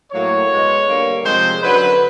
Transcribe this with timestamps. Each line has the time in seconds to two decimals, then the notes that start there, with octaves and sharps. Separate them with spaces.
0.11 A2 F#3 A#3 C#5
0.49 B2 G#3
0.86 G2 D3 G3 A#3
1.24 C3 F3 G#3 C5
1.62 F#2 D3 F#3 B4